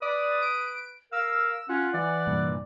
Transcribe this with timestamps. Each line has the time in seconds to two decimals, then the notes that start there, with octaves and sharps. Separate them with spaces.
0.02 B4 D5 D#6
0.42 D7
1.12 A#4 F5 E6
1.69 C#4 F4 F#5
1.94 E3 D5
2.27 C2 G2 A#2